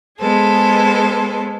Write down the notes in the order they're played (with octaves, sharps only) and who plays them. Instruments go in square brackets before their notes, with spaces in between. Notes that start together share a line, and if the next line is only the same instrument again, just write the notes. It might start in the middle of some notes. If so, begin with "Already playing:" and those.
[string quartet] G#3 B3 G#4 A4 C5